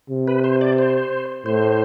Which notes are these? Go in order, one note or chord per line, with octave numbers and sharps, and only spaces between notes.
C3
B4
C5
D5
C5
A2 C5